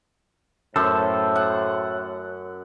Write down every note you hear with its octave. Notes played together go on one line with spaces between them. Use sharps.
F#2 A2 A4 C5
F#5